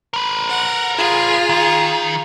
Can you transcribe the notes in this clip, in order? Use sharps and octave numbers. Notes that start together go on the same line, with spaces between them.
A#4 B4
F#5
F4 G#4
D#3